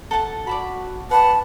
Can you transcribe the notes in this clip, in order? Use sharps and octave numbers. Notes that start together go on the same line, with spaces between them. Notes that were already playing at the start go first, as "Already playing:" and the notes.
A4 F#5 A5
F#4 D5 A5 B5
B4 F#5 A5